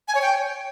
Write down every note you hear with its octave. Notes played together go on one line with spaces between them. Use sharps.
G#5
C#5
G5